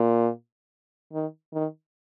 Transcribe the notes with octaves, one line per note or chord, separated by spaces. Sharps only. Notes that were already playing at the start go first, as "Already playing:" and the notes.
Already playing: A#2
D#3
D#3